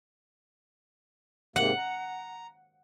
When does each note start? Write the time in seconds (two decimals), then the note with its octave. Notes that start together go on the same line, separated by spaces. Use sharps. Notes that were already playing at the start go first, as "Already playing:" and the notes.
1.56 G#2 C3 A#3 F#5
1.78 A#5